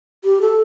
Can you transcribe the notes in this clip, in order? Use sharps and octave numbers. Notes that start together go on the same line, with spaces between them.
G4
A4